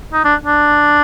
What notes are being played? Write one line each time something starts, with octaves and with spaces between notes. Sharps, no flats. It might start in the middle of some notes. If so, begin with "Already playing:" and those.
D#4
D4
D4